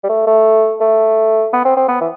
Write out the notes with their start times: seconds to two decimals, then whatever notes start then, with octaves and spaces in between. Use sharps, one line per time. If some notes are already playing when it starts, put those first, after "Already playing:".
0.03 G3
0.09 A3
0.27 A3
0.80 A3
1.53 B3
1.65 C4
1.77 C4
1.88 B3
2.01 E3